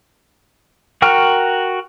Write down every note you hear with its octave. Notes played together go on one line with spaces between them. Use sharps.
F#4 A#4 G5 C#6 F6